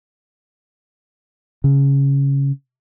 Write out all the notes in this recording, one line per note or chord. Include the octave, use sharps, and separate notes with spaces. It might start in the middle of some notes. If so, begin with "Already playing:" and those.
C#3